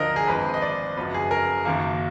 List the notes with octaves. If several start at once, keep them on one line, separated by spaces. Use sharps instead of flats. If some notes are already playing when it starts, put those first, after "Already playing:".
Already playing: D2 D3 F3 A#4 D#5 A#5
G#4
G#1 G#2 F3 B4
D#5
D5
F#1 F#2 F3 B3 B4
G#4
A#4
F#1 F#2 D#3 A#3